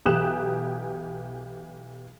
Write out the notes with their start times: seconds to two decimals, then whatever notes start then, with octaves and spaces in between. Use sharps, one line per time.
0.06 B1 E3 G4 D#6 F#6 E7